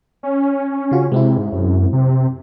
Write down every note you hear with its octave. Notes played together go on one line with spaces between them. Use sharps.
C#4
C#3 F4 F#4
C3 G#3 C4 E4
G#2
F#2
C3